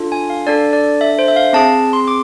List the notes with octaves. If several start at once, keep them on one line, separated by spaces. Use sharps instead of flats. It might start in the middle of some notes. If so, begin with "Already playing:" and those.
Already playing: D4 F4 A4
G#5
F5
D4 A4 D5
D5
E5
C5
E5
F5
C4 G#4 A5
C6
D6